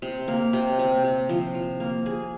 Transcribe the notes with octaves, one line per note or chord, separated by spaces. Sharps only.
C3
A#3
C3
C3
C3
F3
F3
A#3
G#4